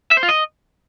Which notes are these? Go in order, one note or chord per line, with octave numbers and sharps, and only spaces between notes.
E5
C5
F4
D#5